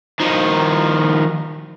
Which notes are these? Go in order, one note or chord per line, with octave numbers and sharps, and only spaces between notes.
D#3 F3